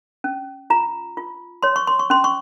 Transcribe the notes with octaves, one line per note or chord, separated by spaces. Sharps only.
C#4
F4 A#5
F4
C#5 C6
C#6
C6
C#6
C#4 C6
C#6